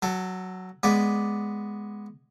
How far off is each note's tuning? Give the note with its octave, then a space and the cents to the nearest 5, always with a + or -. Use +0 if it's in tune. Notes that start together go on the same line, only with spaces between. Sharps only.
F#3 +5 A4 +20
G#3 +0 B3 +0 D5 +0